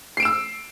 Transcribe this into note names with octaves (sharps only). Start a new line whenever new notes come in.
E6 C7 D7 E7